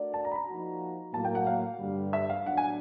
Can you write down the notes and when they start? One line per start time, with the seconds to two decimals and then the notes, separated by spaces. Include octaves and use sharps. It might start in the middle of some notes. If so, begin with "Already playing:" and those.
Already playing: A3 D4 F#4 A#4 D5
0.14 A5
0.25 A#5
0.32 B5
0.36 A#5
0.46 F3 A#3 D#4 F#4
1.13 A2 F#3 A#3 A5
1.25 G5
1.35 F#5
1.47 F5
1.79 G2 D3 G3
2.13 E5
2.30 F5
2.46 A2 F#3 B3 D4 F#5
2.57 G#5